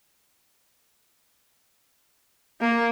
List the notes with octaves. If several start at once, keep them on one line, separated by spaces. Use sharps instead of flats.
A#3